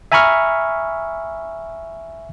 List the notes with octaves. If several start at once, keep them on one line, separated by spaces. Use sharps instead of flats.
E5 G#5 A#5 B5 C#6 F6